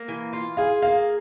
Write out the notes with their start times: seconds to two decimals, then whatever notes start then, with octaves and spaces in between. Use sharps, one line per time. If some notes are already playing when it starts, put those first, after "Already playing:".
Already playing: A#3
0.08 E3
0.33 F4
0.57 G#4 F5
0.82 A#3 F5